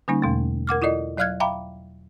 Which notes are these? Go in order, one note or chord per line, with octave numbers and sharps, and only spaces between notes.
D3 G3 A#3 C#4 D#4
E2 B2 A3
A#4 F#5 D6 F6
E4 F4 A4 D5 D#5
F#3 D5 F5 F6 F#6 G#6
E5 F5 G5 A#5 B5 D6